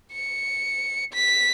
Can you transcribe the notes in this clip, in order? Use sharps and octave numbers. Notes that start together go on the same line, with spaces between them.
C#7
B6